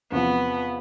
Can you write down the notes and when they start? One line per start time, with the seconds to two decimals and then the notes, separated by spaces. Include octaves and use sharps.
0.12 E2 C3 F3 B3